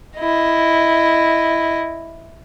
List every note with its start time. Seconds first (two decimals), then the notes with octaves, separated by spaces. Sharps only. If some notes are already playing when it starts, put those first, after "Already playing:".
0.19 E4 D#5